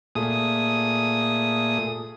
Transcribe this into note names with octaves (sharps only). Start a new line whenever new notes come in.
A#2 A3 G#4 D#6